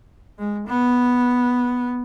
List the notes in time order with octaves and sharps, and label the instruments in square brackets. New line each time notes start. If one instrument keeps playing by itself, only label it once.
[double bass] G#3
B3